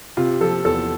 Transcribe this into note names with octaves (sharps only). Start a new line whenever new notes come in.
C3 F4
F3 A4
E2 A4